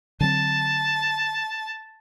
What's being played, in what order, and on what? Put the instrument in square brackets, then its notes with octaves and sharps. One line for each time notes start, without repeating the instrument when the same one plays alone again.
[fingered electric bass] D3 F#3 C4 [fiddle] A5